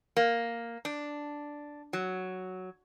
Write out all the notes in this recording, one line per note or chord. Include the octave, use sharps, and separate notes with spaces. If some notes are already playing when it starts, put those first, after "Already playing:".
A#3
D4
F#3